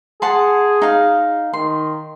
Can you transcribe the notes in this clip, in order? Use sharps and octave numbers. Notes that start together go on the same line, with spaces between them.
G#4 F#5 A5 C6
D#4 F5
D#3 C6